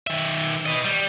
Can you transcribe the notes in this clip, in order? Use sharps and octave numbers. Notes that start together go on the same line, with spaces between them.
D#3 E5
B4 D#5
G3